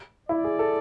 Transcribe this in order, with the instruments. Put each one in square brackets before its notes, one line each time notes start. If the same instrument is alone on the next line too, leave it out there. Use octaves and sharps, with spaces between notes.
[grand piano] E4 [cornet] D5
[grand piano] G#4
A4